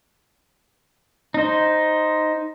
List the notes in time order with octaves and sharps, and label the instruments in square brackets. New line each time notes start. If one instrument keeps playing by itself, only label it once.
[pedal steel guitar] D#4 C5